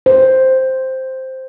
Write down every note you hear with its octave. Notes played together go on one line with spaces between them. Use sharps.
C5